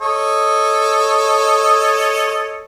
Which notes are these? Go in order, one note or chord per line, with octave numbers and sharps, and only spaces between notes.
A4 C#5 D#5